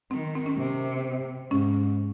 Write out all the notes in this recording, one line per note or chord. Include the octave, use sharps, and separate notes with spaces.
D#3 C4
C4
C#4
C3
G#2 C#4